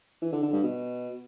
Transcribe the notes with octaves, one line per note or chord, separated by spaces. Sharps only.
E3
D3
D3
G2
B2